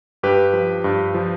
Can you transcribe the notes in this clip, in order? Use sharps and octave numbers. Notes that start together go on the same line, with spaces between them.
G2 G4 B4
F3
G2
F3